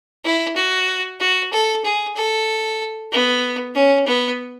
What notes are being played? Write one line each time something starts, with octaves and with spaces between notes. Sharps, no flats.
E4
F#4
F#4
A4
G#4
A4
B3
C#4
B3